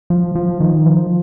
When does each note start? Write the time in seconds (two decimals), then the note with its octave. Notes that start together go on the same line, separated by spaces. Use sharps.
0.10 F3
0.35 F3
0.60 D#3
0.86 F3